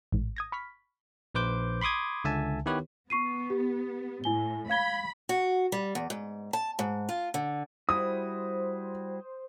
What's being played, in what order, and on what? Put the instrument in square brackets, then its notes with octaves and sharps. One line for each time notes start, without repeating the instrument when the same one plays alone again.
[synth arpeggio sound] A1 G#2
D#6 G#6 A#6
B5 C#6 F6 B6
[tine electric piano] A#1 B4 C5 D6 G6
B5 C6 D6 D#6 G#6
C#2 D3 E5 G#5 A5
D#3 B3 E4 G4 B4 C#5
[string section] B3 [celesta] C#6 C7 D#7
[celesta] G4
[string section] A2 [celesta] E4 G#5 G7
[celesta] F5 G#6 G7 [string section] B5
[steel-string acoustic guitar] F#4
G3
E2
G#2
A5
G#2
F4
D3
[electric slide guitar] G3 E4 F#4 [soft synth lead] C5 [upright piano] D#6